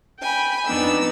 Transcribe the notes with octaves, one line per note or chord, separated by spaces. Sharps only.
G5 G#5 B5
F2 F3 B3 D4 D#4 E6